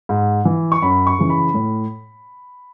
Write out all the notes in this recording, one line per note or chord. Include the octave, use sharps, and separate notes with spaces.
G#2
E3
C#6
F#2 B5
C#6
C#3 E3
B5
A2